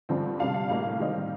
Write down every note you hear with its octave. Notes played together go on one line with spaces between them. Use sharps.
G2 D3 F3 C4
C3 G3 D4 F5 A5
F5
A2 G3 A#3 F5
D#3 G3 C4 D#4